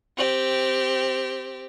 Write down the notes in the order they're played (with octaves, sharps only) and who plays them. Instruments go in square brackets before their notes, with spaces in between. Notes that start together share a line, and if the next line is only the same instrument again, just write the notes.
[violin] C4 G4